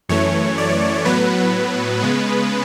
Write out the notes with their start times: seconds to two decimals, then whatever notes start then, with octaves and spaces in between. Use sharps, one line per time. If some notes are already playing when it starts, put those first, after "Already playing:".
0.09 F#2 E3 A3 C#5
0.58 D5
1.05 A2 F#3 B3 B4
2.00 C#3 G#3 B3